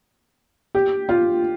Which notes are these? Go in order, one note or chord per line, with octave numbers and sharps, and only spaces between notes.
G4
F4